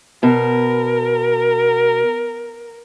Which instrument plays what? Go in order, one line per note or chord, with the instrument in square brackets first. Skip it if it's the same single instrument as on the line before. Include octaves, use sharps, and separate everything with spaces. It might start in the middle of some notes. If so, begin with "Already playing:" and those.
[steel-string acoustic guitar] B2 [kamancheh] A#4